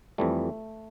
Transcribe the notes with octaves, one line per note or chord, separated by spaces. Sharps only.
F2 E3 G3 A3